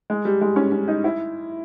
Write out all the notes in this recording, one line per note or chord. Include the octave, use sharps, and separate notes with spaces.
G#3
G3
G#3
C#4
C#4
D#4
E4